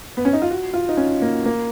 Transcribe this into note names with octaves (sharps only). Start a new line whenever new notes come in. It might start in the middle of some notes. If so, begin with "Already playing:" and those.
B3
C#4
D#4
F4
F#4
F4
D#4
C#4
A#3
A#3